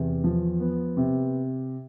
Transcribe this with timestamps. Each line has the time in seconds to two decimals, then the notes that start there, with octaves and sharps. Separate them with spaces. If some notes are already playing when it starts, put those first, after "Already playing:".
Already playing: E2 C3
0.24 F3
0.60 B3
0.97 C3